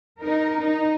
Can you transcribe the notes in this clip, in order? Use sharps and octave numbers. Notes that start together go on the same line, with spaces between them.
D#4 A#4
D#4